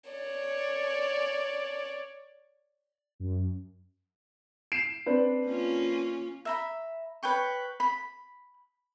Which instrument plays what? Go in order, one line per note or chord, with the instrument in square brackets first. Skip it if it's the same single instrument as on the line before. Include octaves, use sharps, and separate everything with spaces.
[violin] C#5 D5
[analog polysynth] F#2
[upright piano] C7 D7 E7
C4 D4 B4
[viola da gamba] A#3 C#4 F4
[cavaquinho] E5 A#5 B5
B4 C#5 G5 C#6
B5